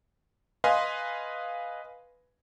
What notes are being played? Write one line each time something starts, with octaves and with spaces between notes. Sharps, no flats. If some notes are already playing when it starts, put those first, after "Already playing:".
B4 D#5 F5 G#5 C6